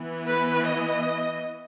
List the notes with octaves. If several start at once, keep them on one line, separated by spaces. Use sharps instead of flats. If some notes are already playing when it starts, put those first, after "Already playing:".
Already playing: E3 B3
B4
D#5